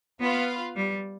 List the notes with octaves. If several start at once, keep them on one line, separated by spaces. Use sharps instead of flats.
B3 F4 B4 F5
G3